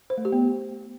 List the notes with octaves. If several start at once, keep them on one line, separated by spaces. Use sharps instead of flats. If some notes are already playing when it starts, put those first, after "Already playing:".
C5
A3
G4
B3